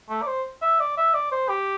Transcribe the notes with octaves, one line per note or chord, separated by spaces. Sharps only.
A3
D5
C5
E5
D5
E5
D5
C5
G4